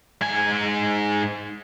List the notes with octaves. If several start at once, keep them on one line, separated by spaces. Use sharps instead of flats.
G#2 G#5